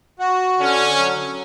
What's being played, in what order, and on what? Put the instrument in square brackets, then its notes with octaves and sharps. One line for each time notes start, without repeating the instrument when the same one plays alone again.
[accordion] F#4
[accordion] D3 [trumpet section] C#4
[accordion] F#3